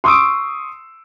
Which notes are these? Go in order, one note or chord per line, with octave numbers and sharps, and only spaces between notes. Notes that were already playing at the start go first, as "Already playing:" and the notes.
C6 C#6 D#6 E6 D7